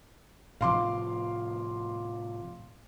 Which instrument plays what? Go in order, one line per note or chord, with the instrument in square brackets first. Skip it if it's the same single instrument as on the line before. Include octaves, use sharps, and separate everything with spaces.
[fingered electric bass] A2 C3 F3 [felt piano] F5 C6 D6